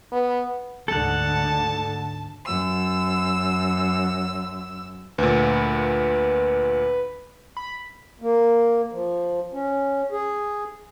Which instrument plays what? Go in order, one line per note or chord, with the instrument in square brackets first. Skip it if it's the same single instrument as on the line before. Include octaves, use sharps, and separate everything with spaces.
[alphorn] B3
[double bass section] D2 G#2 D3 [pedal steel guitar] A4 F#5 [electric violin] A5
[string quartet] F#2 E6
[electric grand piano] D2 A#2 [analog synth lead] B4
[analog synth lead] B5
[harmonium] A#3
F3
C#4
G#4